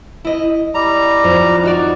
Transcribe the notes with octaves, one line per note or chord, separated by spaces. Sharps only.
E4 D#5
G3 A#5
F2
D#4 F#4 D5